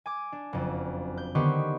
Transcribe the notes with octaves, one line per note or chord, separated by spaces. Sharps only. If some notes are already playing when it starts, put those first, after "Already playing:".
G#5 D6
D4
F#1 F2
G6
D3 D#3 B3 G4 C5 C#6